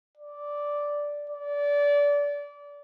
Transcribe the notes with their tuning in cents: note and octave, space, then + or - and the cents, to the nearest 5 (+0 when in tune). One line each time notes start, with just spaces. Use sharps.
D5 -5
D5 -25